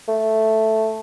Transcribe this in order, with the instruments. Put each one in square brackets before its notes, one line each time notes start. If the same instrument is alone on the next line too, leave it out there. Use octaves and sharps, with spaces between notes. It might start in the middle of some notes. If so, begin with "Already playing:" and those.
[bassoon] A3